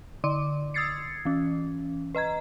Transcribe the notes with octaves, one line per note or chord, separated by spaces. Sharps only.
D3 D5 C6 D6
D#6 E6 G#6 A6 C7 C#7
E3 C#4
B4 D#5 A#5 G#6